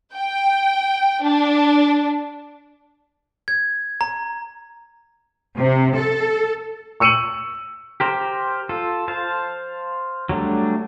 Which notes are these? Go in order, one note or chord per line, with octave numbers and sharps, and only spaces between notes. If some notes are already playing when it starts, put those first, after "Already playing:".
G5
D4
G#6
A#5
C3
A4
C#6 E6 C#7 D#7 E7 F#7
G4 A#4 C5
F4 A4
C5 F5 A5
F#3 G3 A3 D4